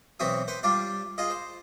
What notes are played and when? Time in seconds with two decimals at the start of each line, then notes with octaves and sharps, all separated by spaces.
0.20 B1 E3 C4 F#4 E5 D#6
0.48 B4 C5 F#5
0.63 G3 D4 F4 D5
1.18 F4 G#4 D#5
1.30 C5